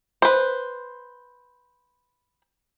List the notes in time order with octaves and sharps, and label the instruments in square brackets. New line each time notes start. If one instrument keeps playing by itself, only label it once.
[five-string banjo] B4 C5